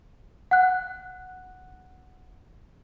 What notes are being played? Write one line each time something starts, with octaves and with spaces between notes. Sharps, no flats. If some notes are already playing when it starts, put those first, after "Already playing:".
F#5 F#6